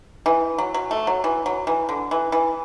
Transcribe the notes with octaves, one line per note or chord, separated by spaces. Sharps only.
E3
F#3
F#3
A3
F#3
E3
F#3
E3
D3
E3
E3